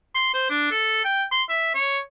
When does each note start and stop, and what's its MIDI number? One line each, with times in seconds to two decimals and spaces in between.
0.15 0.30 84
0.33 0.47 72
0.49 0.69 62
0.71 1.02 69
1.04 1.23 79
1.31 1.42 84
1.49 1.74 76
1.74 1.98 73